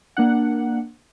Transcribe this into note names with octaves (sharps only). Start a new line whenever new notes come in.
A#3 D4 F#5